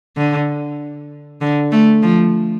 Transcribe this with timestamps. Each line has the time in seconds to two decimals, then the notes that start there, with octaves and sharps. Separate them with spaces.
0.17 D3
1.42 D3
1.72 A3
2.03 F3